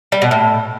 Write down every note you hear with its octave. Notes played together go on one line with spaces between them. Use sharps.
G3
B2
A2